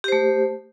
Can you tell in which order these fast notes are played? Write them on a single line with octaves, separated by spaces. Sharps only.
G4 C5 A3